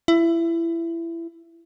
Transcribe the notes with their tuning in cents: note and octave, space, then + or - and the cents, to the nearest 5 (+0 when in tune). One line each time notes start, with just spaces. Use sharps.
E4 +20